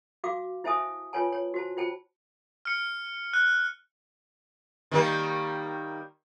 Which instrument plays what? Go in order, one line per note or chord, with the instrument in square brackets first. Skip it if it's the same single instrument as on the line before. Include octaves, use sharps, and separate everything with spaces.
[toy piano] F#4 F5 D6
E4 C5 E5 G#5 A5 D#6
F4 B4 C#5 G#5 A5
C#5
F#4 C5 A5
F4 C5 G5 A5
[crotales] F6 C#7
F#6
[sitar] D#3 G3 A#3